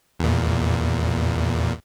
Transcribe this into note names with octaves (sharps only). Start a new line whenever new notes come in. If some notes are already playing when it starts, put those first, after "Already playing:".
E2 A#2